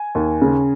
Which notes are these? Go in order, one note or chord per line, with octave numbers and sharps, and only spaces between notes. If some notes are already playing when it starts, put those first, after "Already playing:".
Already playing: G#5
D#2
C#3